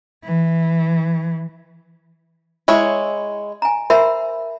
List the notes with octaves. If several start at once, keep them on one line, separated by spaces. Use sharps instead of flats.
E3
G#3 E4 C#5
G#5 A#5
A#4 C5 E5 B5